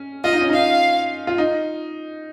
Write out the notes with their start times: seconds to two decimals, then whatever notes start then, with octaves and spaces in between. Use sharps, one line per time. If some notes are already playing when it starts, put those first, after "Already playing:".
Already playing: C#4
0.24 F4 D#5
0.33 D#4
0.41 C#4
0.49 D#4 F5
1.27 F4
1.38 D#4